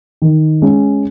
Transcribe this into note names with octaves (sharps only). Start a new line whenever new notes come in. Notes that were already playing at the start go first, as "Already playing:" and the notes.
D#3
G#3 C#4